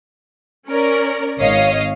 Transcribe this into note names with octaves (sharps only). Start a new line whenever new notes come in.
C#4 A#4 D5
G#1 C#5 D#5 F5 D#6